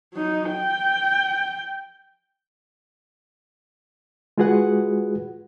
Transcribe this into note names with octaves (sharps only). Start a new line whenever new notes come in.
F#3 D#4
G5
G#3 F4 F#4 G#4 B4 F#5